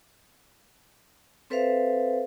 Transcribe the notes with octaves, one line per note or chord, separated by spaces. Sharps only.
C4 A4 B4 C5 E5 F5